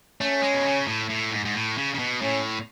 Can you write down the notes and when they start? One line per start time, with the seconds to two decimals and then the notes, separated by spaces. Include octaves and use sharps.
0.21 A3 C#4
0.43 G#3
0.54 B2
0.65 C#3
0.88 A2
1.09 A2
1.32 G#2
1.45 G#2
1.55 A2
1.78 C#3
1.95 C#3
1.99 B2
2.21 A2 C#4